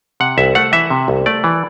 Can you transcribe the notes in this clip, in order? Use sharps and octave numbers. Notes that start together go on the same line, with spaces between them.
C3 F#5
C2 E5
A3 F#5
E3 E5
C3
C2
A3 D5
E3